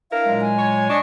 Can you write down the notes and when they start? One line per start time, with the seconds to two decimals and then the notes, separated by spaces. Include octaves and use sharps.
0.11 D4 E4 A#4 F5
0.26 A#2 F#3 G#3
0.41 G#5
0.58 C#5
0.89 D4 D5 D#5 C#6